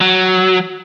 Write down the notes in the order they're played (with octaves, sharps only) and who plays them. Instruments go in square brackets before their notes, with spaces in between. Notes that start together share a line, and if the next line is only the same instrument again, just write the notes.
[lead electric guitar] F#3